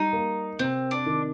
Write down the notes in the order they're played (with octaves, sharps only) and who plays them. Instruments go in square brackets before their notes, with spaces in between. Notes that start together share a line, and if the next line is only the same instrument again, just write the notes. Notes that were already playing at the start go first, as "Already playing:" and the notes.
Already playing: [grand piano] G3 [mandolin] D#4
[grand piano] A#3
[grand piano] C3 [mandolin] C4
[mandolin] D4
[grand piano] D#3